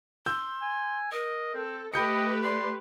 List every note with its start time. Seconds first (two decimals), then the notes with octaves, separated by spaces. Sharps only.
0.26 C6 E6 G6
0.62 G#5
1.12 A#4 D#5
1.55 C4 A4
1.94 A3 G4 B4 D#5 G5 B5 G6 C#7
2.44 D5 C6